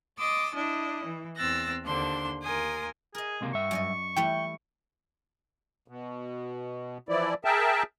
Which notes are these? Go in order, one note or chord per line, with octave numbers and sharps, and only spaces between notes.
D#5 C6 D6 E6 A6
D4 E4 D#5
E3
E2 C4 E6 F#6 A6 A#6
D#2 D3 D4 C5 C6
D#2 A#4 G#5 C6 D#6
G#4 A#4 D#5
C#2 C3 A#3
G2 E5 C#6
F#2 D5 D#5
E3 G3 A3 G5
B2
E3 F3 E4 D5
G#4 A#4 E5 G5 A5